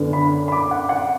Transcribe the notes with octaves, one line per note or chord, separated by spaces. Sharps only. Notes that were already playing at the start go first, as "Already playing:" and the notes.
Already playing: F#2 D3 B3 D4
B5
B5
D6
F#5
F#5